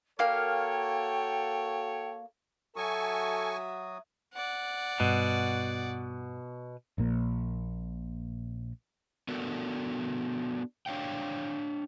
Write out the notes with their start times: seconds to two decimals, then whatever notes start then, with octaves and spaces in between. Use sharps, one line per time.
0.19 A#3 F#4 A4 C#5 F5 G5
2.76 F#3 F#4 A4 E5 G#5 C#6 D#6
4.34 D5 F#5
5.00 G2 B2
6.98 A#1 A#2 A#3
9.28 B3 D4 F#4 A4 A#4
10.86 D4 C#5 F5 G5